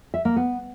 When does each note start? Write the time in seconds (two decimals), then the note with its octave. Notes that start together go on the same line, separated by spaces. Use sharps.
0.14 E5
0.25 A#3
0.36 B3